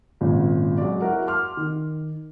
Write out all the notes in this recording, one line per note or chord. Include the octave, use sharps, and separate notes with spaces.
G#1 A#2 C#3
F#3 G#3 F#4 D5
E4 F#4 A#4 F#5
C6 D6 F6
D#3